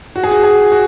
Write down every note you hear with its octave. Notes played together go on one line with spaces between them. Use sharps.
F#4
G#4
F#4
G#4
F#4